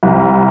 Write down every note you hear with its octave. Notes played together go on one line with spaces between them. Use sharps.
C2